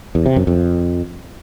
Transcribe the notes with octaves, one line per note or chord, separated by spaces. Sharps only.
E2
C3
F#2
F2